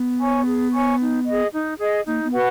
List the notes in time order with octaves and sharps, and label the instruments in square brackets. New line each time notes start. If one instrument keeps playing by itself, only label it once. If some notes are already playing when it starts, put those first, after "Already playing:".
Already playing: [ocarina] B3
[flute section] C#5 G#5 C#6
G#4
C#5 G#5 C#6
D#4
G#4 D#5
D#4
G#4 D#5
[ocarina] A#3 [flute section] D#4
[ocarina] B3
[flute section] F#4 B4 F#5